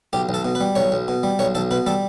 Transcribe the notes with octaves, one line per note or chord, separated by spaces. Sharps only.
B1 G4
B1
A4
B2
B4
G3
B1 C#5
B1
B2
G3
B1 C#5
B1 A4
B2 B4
G3 A4